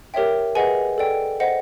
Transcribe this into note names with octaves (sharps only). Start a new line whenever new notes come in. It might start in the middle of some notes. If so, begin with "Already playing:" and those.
G4 A#4 C#5 E5 G5
G#4 B4 D#5 F#5 G#5
A4 D5 G5
C5 D#5 F#5